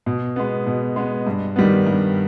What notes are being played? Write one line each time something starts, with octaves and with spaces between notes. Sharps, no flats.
B2
G#3 B3
B2
G#3 B3
G2
D#3 G3 B3
G2